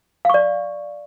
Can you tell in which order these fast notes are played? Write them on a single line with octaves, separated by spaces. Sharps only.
F5 C#6 D5